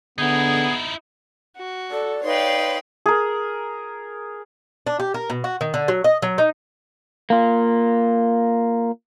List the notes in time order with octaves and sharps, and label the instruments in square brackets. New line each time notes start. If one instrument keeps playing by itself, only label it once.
[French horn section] D3 [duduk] B3 [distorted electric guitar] D#4 E4 [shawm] G#4
[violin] F#4
[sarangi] A4 [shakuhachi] D5
[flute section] D#4 B4 F5 [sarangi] C#5 [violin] G5 C6
[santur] G#4 A#4
[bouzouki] D4
G4
A#4
B2
F#4
D#3
D3
F#3
D#5
F#3
D#4
[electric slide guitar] A#3 F4